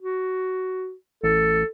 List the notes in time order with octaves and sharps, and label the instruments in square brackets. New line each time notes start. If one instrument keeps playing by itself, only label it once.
[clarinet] F#4
[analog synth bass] A1 [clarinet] A4